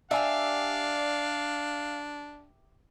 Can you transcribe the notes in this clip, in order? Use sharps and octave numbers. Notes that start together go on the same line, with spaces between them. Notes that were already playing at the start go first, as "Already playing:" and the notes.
D4 G4 D5 E5 F5 G#5